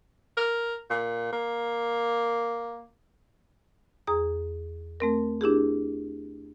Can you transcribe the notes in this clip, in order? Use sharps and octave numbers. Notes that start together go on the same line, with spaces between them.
A#4
A#2
A#3
E2 G#4 A#5 D#6
A3 C4 A#4
D4 E4 G4 G#4